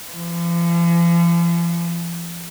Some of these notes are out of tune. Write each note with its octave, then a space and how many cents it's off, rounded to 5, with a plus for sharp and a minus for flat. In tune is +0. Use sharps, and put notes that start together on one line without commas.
F3 -45